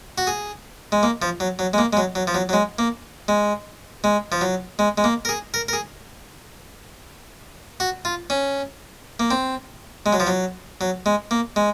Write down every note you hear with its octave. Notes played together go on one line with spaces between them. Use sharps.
F#4
G#4
G#3
A#3
F3
F#3
F#3
G#3
A#3
G#3
F#3
F#3
F3
F#3
F#3
G#3
A#3
G#3
G#3
F3
F#3
G#3
G#3
A#3
A#4
G#4
A#4
A#4
G#4
F#4
F4
C#4
A#3
C4
G#3
F#3
F3
F#3
F#3
G#3
A#3
G#3